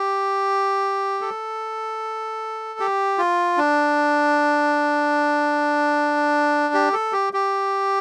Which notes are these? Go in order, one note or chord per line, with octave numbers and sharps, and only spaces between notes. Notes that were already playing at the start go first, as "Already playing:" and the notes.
Already playing: G4
A4
G4
F4
D4
G4
A4
G4
G4